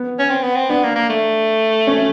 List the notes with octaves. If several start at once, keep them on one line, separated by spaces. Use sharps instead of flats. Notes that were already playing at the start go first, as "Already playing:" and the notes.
Already playing: B3
C#4
C4
B3
C4
B3 D4
A#3
A#3
A3
C#4